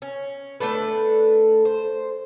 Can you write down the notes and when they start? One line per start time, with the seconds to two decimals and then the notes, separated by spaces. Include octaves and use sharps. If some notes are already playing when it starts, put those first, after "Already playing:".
0.02 C#4
0.60 A3 D4 A4 B4
1.65 C5